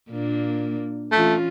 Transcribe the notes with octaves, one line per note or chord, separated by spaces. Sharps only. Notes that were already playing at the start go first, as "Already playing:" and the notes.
A#2 A#3 D4
E3 A3 C#4 F4